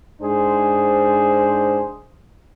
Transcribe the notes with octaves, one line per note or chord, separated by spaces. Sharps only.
G#2 D4 G#4 C5